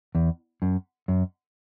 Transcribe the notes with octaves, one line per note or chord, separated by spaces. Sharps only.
E2
F#2
F#2